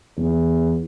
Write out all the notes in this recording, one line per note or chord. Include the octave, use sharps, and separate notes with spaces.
E2